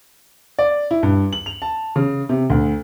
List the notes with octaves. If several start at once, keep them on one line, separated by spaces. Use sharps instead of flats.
D5
E4
G2
F#7
F7
A5
C#3
C3
D2